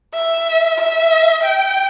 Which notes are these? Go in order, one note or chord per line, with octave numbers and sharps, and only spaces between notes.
E5
E5
G5